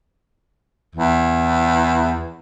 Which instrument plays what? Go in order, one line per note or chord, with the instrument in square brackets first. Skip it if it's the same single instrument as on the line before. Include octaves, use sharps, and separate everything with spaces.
[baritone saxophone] E2